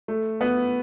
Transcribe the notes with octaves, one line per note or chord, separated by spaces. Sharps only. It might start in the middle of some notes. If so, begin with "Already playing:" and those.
A3
B3